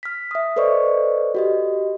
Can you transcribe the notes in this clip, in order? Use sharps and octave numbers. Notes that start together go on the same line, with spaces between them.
F6 B6
E5 D#6
A4 B4 C5 D5 D#5 C#6
F#4 G4 D#5